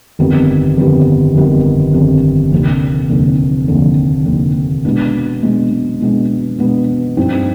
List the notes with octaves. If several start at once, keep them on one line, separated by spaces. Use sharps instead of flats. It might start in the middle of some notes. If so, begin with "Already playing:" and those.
G1 F2 D#3 G3 B3
G1 F2 D#3 G3 B3
G1 F2 D#3 G3 B3
G1 F2 D#3 G3 B3
F1 D#2 D3
F1 D#2 D3
F1 D#2 D3
F1 D#2 D3
B2 G#3 B3 D4
B2 G#3 B3 D4
B2 G#3 B3 D4
B2 G#3 B3 D4
G2 F3 C4 D#4